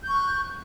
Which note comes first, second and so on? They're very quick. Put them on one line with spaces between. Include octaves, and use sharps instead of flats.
G6 C#6 F#6